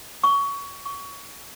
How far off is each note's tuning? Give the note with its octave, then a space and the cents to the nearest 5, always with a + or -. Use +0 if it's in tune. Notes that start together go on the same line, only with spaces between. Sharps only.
C#6 +20
C#6 +25